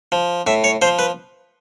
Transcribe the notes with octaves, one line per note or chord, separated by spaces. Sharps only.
F3
A2 E5
C#5
F3 C5
B4